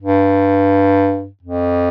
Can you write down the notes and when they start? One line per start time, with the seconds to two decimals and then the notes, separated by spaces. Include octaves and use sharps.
0.01 G2
1.43 F2